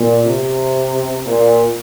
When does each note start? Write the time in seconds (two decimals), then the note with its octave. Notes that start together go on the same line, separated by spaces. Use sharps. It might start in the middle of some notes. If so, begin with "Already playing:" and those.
Already playing: A#2
0.26 C3
1.26 A#2